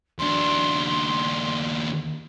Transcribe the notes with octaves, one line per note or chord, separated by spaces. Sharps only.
D#2 D4 C6